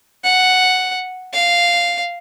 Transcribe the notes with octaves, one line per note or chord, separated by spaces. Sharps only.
F#5
F5